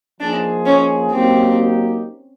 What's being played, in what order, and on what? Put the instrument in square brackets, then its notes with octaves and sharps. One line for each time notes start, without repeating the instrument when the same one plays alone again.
[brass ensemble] F3 A#3 D#4 G#4 C5 [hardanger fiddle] D4
[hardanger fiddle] C#4
[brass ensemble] F#3 A#3 D#4 G4 [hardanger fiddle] C4